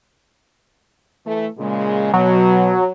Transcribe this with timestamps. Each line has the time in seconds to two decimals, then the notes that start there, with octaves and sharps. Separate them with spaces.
1.25 E3 A3
1.58 A#2 C#3 G#3
2.14 B2 F#3